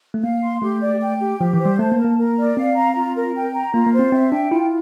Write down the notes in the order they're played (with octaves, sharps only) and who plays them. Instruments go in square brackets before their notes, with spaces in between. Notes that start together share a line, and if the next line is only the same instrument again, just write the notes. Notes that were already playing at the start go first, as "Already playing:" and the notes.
[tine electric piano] A3
[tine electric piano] A#3 [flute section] F5
[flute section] C6
[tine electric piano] A3 [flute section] G4
[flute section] D5
G5
G4
[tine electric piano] F3 [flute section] G4
[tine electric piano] E3
[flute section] C5
[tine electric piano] G3
[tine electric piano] A3 [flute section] A5
[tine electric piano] A#3
[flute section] A#4
[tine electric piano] A#3
[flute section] A#4
D5
[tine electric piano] C4 [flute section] F5
[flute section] A#5
F4
A#4
G5
A#5
[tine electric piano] A#3 [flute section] F4
[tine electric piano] A#3
[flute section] C5
[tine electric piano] C4
[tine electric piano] C4 [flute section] E5
[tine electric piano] D4 [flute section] G5
[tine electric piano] E4 [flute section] F4